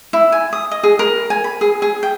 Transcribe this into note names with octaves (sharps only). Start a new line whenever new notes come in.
E4
G#5
D#6
D#5
G#4
A#4
G#5
B5
G#4
G#4
G5